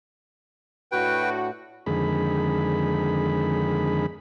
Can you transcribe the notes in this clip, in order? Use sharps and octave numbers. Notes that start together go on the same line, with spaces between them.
A2 D4 F#4 B4 G5
F2 D3 D#3 G#3 G#4 B5